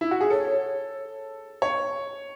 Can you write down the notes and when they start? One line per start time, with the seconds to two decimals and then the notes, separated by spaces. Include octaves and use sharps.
0.01 E4
0.11 F#4
0.21 G#4
0.30 A4 C#5
1.62 C#5